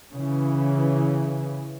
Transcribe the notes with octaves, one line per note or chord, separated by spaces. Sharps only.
C#3 E3